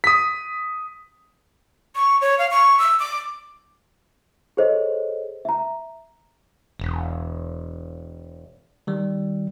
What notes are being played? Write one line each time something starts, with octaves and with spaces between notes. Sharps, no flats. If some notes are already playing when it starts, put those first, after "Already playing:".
D#6 B6
C#6
C#5
F5
C#6
E6
D6
G#4 A4 C5 C#5 D#5
E5 A#5
E1
D#3 G3